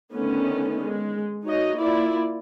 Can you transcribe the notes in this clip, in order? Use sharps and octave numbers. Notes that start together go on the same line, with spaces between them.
D3 D#3 A3 B3 C#4
G#3
D#4 F#4 C#5 D#5
A#3 E4 F4 D5